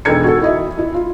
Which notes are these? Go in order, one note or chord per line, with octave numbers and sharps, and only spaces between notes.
E1 D#4 A4 G#6 C#7
F#4 A4
E4 D#5 E5
E4
F4